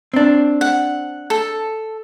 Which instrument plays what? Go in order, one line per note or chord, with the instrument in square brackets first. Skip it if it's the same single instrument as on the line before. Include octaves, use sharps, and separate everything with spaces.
[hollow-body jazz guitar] C4 D4
[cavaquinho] F#5
A4